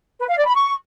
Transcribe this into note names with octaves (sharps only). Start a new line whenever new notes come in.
B4
F5
D5
B5
C#6